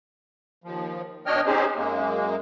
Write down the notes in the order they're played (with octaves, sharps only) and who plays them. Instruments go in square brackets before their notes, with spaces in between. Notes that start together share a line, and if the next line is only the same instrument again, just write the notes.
[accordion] D#2 F3
B2 D4 C#5 D#5 G5 F6
C4 C#4 D#4 G4 G#4 C5
F#2 G#3 A#3